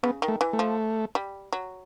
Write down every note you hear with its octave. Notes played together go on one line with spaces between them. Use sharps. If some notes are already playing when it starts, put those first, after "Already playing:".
C#3 B3
D#3
A3
E3
A3
F3
G3
F#3